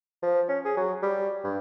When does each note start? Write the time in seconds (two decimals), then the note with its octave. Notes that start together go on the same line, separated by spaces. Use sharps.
0.23 F3
0.48 C#4
0.65 G#4
0.77 F#3
1.03 G3
1.44 G2